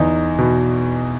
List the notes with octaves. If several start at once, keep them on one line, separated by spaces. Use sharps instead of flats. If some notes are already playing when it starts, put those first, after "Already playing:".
Already playing: E2 D#4
B2